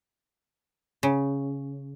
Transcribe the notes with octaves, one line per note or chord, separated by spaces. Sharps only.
C#3